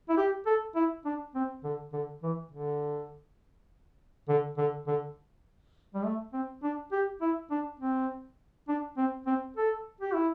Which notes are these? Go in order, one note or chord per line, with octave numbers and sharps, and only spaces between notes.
E4
G4
A4
E4
D4
C4
D3
D3
E3
D3
D3
D3
D3
G3
A3
C4
D4
G4
E4
D4
C4
D4
C4
C4
A4
G4
E4